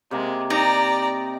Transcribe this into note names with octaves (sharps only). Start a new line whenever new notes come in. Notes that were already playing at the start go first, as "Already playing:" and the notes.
C3 G#3 A#3
D#4 G4 D5 D#5 A#5